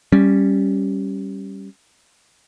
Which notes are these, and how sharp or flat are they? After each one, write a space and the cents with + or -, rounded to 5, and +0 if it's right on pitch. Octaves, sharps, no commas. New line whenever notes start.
G3 +0 C#4 -5